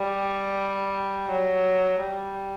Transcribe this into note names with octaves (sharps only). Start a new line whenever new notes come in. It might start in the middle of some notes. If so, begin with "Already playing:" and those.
Already playing: G3
F#3
G3